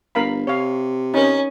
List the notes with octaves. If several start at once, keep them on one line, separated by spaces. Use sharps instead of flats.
G1 A#4 F5 B5
C3 C#5 F5
C#4 D#4 A#4